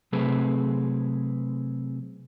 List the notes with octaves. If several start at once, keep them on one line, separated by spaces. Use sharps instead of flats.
C3 F#3 A3 C4 G#4 B4